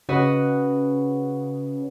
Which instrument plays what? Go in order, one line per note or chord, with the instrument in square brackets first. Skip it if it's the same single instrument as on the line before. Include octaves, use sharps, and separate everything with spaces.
[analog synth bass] C#3 [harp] F#4 B4 D#5